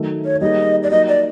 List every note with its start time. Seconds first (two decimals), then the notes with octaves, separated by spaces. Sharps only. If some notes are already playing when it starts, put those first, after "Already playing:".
Already playing: D#3 F#3 A3
0.25 C#5
0.41 G3 A#3 D#4 G#4 D#5
0.83 D5
0.91 F#3 A#3 D#4 D#5
1.08 D5